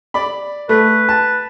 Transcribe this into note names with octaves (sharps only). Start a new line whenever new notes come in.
D5 B5
A3 B4
A5